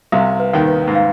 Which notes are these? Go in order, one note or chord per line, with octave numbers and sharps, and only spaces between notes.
C2 C3 F5
B4
D#2 D#3
B4
G#2
F5